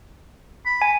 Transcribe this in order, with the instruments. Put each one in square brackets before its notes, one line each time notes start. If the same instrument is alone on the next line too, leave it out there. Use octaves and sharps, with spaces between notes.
[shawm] B5
[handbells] G#5